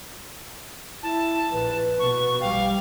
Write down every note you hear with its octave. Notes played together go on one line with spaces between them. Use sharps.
E4 A5
A#1 B4
B2 C#6
A#1 G3 F5 G5